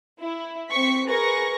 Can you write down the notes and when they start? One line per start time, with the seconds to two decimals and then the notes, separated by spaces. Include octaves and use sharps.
0.21 E4
0.68 C4 C#6 B6
1.08 G#4 A#4 B4 C#6 A#6